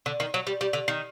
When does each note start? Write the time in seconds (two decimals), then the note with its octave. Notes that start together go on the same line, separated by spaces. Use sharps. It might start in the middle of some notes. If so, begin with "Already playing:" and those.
0.06 D3
0.20 D#3
0.34 F#3
0.47 G3
0.61 G3
0.73 D3
0.88 D#3